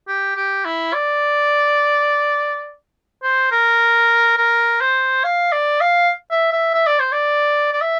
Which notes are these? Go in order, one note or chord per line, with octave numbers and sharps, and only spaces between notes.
G4
G4
E4
D5
C5
A#4
A#4
C5
F5
D5
F5
E5
E5
E5
D5
C5
D5
D5
E5